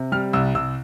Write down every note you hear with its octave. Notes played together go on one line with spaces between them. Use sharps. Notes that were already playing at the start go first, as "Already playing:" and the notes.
Already playing: C3
G3 F6
C2 E6
C2 E6